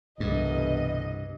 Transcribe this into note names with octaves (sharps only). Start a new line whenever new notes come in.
C2 G2 B2 D3 E3 D#5